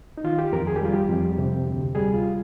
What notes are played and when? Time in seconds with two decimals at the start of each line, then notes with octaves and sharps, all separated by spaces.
0.18 D#4
0.24 D#3 F4
0.39 G4
0.53 F2 A#4
0.67 G#4
0.76 G4
0.81 G3 F4
0.93 G4
1.09 F2
1.38 C3
1.67 D2
1.95 G3 G#4
2.13 F4